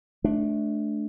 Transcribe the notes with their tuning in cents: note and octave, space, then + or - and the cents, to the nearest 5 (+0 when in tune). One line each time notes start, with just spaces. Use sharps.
A3 -25 D4 +0